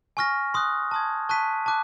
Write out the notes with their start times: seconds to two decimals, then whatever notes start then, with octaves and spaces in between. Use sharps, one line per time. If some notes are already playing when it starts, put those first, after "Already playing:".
0.17 G#5 C#6 F6 A#6
0.54 C6 D#6 F#6
0.91 A5 C6 D#6 G#6
1.29 A5 C#6 F#6 B6 D#7
1.66 A5 D6 F#6